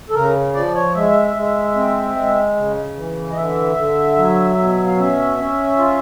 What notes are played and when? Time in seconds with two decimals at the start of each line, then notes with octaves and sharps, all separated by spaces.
0.10 A4
0.15 C#3 A#4
0.54 F3 D5
0.75 C#5
0.95 G#3 E5
1.35 G#3
1.75 C4
2.16 G#3
2.56 C#3
2.97 E3
3.32 D#5
3.37 D3 E5
3.76 D3
4.17 F#3
4.57 B2
4.86 F5
4.97 C#4 E5
5.37 C#4
5.78 F4